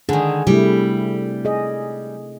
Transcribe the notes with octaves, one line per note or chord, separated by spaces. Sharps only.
D3 D#3 D4 G#4
C3 G3 A3 E4
G#4 D#5